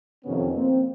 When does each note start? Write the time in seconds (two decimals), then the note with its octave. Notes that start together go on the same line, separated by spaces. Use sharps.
0.25 F2 C3 D#3 B3 C#4
0.54 A#3 C4